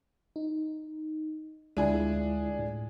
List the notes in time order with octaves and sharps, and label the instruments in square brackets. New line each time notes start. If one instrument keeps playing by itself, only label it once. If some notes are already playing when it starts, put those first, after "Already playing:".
[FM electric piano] D#4
[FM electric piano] D2 [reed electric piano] G#3 E4 F4 [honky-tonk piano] D4 G#4
[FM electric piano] A2